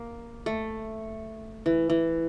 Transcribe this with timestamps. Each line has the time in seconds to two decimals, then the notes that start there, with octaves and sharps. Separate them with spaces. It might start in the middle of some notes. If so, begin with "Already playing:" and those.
Already playing: A#3
0.46 A3
1.66 E3
1.90 E3